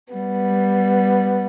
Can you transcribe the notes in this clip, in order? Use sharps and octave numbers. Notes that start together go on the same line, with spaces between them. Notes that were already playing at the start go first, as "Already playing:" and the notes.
G3 B3